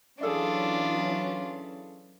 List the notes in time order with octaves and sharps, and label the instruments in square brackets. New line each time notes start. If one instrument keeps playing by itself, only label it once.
[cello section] E3 F#3 C#4 [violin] D4 F4 [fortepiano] G#4 A4 D5